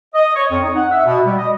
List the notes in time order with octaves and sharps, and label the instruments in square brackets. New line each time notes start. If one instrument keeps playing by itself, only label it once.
[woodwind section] D#5
C#5
F2
D#4
F#5
E5
B2
G3
D#5